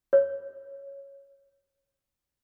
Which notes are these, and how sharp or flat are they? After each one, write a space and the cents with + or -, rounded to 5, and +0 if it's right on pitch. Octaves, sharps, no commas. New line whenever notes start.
C#5 +0